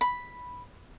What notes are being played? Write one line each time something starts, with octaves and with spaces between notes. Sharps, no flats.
B5